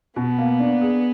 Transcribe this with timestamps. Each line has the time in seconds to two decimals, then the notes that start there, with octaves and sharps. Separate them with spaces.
0.16 B2 B3
0.39 A#3
0.60 D4
0.82 G#4